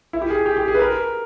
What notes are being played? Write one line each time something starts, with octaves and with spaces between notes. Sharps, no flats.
E4
G4
G#4
G4
G4
G#4
B4
A#4